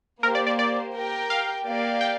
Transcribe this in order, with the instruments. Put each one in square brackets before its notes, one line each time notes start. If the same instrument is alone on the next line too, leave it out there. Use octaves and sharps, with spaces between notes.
[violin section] A#3 G4 C5 [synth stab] A#4
[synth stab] D5
D5
D5
[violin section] G4 A#4 G5
[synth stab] F5
[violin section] A#3 G4 D5 F5
[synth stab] G5